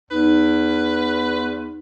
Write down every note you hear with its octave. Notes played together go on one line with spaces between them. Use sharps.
E2 D#4 B4